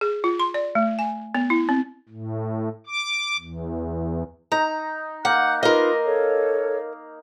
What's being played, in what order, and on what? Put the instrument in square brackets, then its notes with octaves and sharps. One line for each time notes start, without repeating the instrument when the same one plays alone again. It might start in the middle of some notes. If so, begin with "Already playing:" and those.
[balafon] G#4
F4
C6
D5
A3
G#5
B3
E4
C4
[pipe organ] A2
D6
E2
[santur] D#4 [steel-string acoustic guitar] A#5
[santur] A#3 [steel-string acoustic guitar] F#5 [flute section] F#6 G6
[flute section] D#4 F4 B4 [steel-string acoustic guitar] A#4 D#5 [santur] F5
[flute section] A4 C#5